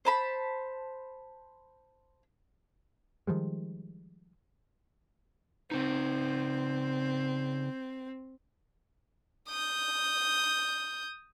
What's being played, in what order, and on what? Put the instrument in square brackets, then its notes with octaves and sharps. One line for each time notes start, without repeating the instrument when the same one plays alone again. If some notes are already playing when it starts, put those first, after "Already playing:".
[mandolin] C5 A5 B5
[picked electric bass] D#3 F3 G3 G#3
[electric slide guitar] C#3 D#4 [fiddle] C4
[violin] D#6 G6